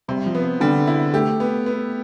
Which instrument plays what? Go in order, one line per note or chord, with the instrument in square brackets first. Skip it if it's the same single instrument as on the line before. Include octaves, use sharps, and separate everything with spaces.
[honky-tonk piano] C3 [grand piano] G3
[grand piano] F3
[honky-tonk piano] B3
[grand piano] D3 [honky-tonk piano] G3
[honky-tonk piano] E4
[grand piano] A3 [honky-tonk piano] G4
[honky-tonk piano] B3
B3